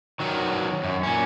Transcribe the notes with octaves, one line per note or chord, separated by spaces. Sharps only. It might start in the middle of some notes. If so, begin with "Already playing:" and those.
D#3 F#3
F#2
A#2 C#4